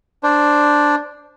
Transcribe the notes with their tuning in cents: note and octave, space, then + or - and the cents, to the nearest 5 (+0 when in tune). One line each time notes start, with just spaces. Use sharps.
D4 +0 C5 +0